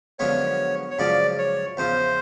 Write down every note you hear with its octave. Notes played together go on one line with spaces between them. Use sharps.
F#2 D3 F3 G#3 B3 C#5
C#5
F#2 C#3 F3 G#3 D5
C#5
E2 C#3 F3 C5